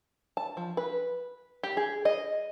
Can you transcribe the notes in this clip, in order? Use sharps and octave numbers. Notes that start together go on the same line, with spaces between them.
A5
F3
B4
G4
G#4
D#5